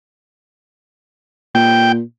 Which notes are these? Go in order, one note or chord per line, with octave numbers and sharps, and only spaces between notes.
A#2 G5